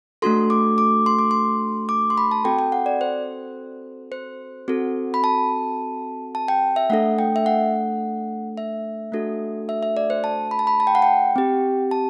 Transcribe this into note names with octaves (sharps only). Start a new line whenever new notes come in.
A3 D4 F#4 A4 C6
D6
D6
C6
D6
C6
D6
C6
B5
A5
C4 F#4 A4 G5
G5
F#5
D5
C5
C5
C4 F#4 A4
B5
A5
A5
G5
E5
A3 D4 A4 F#5
G5
E5
F#5
E5
A3 D4 F#4 A4
E5
E5
D5
C5
A5
B5
A5
B5
A5
G5
F#5
G5
C4 G4
A5